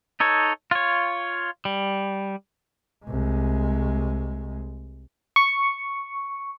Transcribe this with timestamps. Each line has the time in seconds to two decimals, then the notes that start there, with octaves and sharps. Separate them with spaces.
0.20 D#4 A4 C#5
0.71 F4 C#5
1.65 G3
3.06 C2 G#3
5.36 C#6